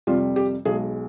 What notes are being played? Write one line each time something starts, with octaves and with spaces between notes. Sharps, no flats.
F2 C3 G3 F4
G4
B1 B2 G#3 G#4